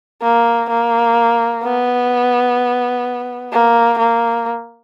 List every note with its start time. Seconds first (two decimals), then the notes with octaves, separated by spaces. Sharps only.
0.22 A#3
0.70 A#3
1.63 B3
3.52 A#3
3.99 A#3